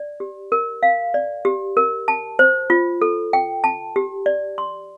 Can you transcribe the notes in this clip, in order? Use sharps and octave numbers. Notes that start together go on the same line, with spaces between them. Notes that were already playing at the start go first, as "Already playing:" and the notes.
Already playing: D5
G4
A#4
F5
D5
G4
A#4
A5
C5
F4
A4
G5
A5
G4
D5
C6